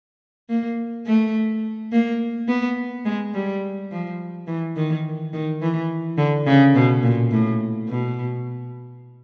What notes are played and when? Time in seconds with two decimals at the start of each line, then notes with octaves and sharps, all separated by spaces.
0.49 A#3
1.06 A3
1.92 A#3
2.48 B3
3.05 G#3
3.34 G3
3.91 F3
4.47 E3
4.76 D#3
5.33 D#3
5.62 E3
6.18 D3
6.47 C#3
6.75 B2
7.03 A#2
7.31 A2
7.89 B2